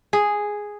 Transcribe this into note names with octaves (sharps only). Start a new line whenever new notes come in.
G#4